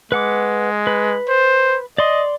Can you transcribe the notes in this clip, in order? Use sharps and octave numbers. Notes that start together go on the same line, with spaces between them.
G#3 B4 F#5 D6
B4
C5
D5 D#5 C6